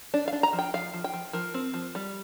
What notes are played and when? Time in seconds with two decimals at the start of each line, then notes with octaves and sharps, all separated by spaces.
0.14 D4 D5
0.28 F5
0.33 D4
0.43 A#5
0.53 F3
0.59 G5
0.74 F3 F5
0.94 F3
1.04 G5
1.13 F3
1.33 F3 A#4
1.54 C4
1.74 F3
1.95 G3